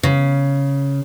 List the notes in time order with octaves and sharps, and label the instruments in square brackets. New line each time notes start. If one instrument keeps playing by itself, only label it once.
[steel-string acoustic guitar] C#3